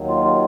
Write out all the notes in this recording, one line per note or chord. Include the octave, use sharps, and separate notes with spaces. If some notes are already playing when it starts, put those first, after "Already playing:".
Already playing: D#2 D#3 F#3
F4
F4